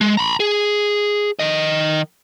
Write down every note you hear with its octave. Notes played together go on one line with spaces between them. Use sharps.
G#3
A#5 B5
G#4
D#3 D#5